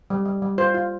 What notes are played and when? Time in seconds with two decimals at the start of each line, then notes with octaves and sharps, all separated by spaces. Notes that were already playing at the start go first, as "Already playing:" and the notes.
0.10 G3
0.25 G3
0.42 G3
0.58 F4 C5
0.74 F4